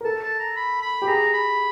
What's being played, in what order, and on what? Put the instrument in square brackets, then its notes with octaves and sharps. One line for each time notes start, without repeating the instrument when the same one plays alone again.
[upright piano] A#4
[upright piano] A4 [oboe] A5
[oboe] A5
A#5
B5
B5
[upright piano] G4
[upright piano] G#4 [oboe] A#5
[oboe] B5